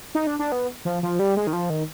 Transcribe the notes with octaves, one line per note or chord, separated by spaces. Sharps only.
D#4
D4
D4
B3
F3
F3
G3
G#3
D#3
F3
D#3